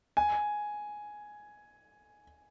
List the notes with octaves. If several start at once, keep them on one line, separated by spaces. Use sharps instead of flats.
G#5